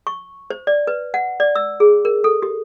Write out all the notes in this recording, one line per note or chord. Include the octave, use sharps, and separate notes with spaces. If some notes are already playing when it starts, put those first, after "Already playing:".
C#6
C5
D5
B4
F#5
D5
E6
G#4
A#4
A4
G4